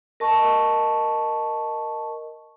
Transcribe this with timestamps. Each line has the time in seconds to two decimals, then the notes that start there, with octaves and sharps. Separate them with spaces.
0.20 A#4 D#5 A5 C#6